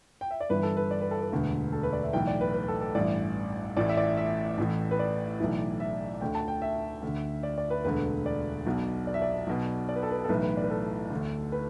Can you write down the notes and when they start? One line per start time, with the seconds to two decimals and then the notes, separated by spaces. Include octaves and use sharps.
0.21 G5
0.31 E5
0.41 D5
0.50 G1 G2 E3 B4
0.63 A4
0.77 B4
0.91 D5
1.01 B4
1.11 A4
1.22 B4
1.32 E1 D2 D3
1.73 A4
1.83 B4
1.93 D5
2.03 E5
2.13 B1 A2 E3 G5
2.27 D5
2.41 B4
2.54 B4
2.68 A4
2.81 A4
2.95 A1 G2 E3 D5
3.77 A1 A2 E3 D5
3.89 E5
3.97 D5
4.03 E5
4.17 E5
4.58 A1 A2 E3
4.91 B4
4.99 D5
5.40 B1 A2 E3
5.80 E5
6.21 D2 D3 G5
6.35 A5
6.48 G5
6.62 E5
7.02 D2
7.07 D3
7.43 D5
7.58 D5
7.70 B4
7.84 E1 D2 D3 B4
8.26 D5
8.67 B1 B2
9.07 D5
9.14 E5
9.22 D5
9.47 B1 B2
9.89 D5
9.96 B4
10.03 A4
10.11 B4
10.24 A4
10.29 B1 A2 E3 B4
10.43 B4
10.57 D5
10.64 B4
10.70 A4
11.10 D2 D3
11.52 B4